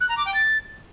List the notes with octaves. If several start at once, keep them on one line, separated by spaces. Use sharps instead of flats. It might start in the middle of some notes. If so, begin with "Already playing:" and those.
F#6
A#5
D6
G5
A6